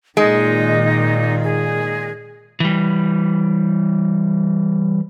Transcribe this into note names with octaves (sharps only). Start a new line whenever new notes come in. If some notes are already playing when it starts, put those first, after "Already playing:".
A#2 D#3 G#3 D#4
G#4
E3 G3